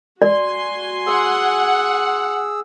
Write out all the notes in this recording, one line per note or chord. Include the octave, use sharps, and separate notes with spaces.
F#4 D5 G#5 C6
G#4 F#5 E6